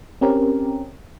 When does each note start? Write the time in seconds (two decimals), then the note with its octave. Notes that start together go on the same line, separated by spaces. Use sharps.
0.21 C4 C#4 G4 A#4